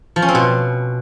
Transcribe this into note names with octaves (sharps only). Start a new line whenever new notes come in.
F3
C#4
C4
B2